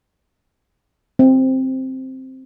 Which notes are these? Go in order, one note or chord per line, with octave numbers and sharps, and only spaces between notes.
C4